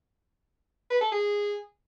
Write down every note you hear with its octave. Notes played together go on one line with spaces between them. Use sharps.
B4
A4
G#4